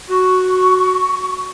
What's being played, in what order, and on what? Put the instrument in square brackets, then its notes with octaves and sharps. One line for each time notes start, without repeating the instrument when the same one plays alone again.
[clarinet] F#4 [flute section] C#6